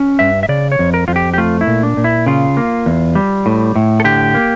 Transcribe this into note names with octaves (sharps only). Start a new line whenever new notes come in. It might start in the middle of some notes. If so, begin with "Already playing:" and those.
Already playing: C#4
G2 E5
E5
C#3 D5
C#5
F2
A#4
F2 F4
G4
G4
A3 F4
E4
A#2
D4
A#2
E4
C#3 F4
A#3
E2
G3
A2
A2
A4
D3 G4
A#3